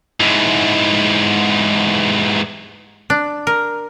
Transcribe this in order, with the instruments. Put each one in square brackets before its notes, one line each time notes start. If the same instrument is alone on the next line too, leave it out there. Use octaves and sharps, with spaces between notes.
[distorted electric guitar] G#2 E3
[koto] D4
A#4